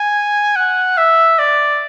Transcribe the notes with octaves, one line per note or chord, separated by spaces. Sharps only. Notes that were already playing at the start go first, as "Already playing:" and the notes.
Already playing: G#5
F#5
E5
D5